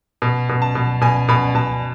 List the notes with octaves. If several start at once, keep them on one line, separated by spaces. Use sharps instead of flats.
B2
B2
A5
B2
B2 G#5
B2 B5
B2 A5